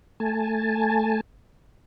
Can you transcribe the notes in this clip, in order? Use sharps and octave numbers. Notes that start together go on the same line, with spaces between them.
A3 G#5 A5